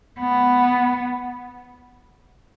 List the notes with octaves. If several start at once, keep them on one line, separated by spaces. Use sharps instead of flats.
B3